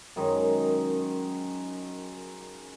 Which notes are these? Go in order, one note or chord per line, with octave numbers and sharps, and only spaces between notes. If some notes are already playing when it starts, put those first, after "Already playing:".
F#2 D#3 G#3 D#4